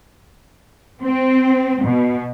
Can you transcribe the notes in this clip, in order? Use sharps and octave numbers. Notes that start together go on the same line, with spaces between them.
C4
B2